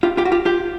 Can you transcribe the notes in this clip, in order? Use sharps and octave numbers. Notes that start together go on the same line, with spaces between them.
F4 G4
F4 G4
F#4
F4 G4
F4 G4